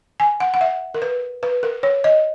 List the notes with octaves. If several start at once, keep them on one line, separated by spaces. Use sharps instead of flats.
G#5
F#5
F#5
E5
A#4
B4
B4
A#4
C#5
D#5